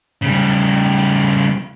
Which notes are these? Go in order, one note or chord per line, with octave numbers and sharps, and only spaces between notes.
C#3 G3